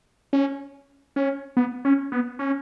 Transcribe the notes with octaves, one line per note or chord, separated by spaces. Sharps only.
C#4
C#4
B3
C#4
B3
C#4